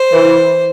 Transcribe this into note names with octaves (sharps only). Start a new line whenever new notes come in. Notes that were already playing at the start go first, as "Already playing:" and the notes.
Already playing: C5
E3